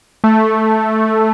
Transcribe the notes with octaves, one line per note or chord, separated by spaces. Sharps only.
A3